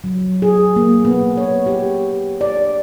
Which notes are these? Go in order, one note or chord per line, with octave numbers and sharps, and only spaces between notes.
F#3
G#4
A#3
B3
C#5
G4
D5